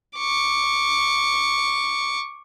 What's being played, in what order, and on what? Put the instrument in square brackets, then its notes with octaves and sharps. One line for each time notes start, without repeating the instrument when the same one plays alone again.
[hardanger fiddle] C#6 D6